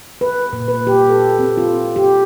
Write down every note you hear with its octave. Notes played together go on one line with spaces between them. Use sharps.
B4
A#2
B4
G4
A4
C4
F4
G4